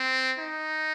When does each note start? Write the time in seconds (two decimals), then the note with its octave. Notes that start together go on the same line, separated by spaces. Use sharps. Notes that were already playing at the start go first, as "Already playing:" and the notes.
Already playing: C4
0.39 D#4